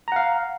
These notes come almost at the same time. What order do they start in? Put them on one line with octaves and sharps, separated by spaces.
A#5 F#5 F5